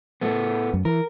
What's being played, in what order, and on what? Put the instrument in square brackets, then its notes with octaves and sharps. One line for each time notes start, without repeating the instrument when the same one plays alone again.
[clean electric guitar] A2 A3 B3
[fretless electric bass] F#2
[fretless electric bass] E3 [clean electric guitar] A#4